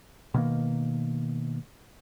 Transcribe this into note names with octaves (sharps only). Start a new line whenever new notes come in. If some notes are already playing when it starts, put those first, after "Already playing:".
B2 D#3 A#3